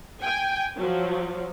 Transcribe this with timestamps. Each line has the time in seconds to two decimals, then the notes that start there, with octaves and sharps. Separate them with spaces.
0.22 G5 G#5
0.77 F3 F#3